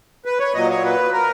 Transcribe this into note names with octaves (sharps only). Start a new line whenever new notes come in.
B4
C#5
A#2 F#3 D#5
C#5
B4
A#4